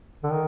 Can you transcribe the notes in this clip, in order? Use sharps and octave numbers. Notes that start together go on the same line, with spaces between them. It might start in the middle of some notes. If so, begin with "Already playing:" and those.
D3
D#3